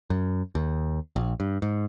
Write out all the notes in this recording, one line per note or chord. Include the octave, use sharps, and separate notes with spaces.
F#2
D#2
A#1
G2
G#2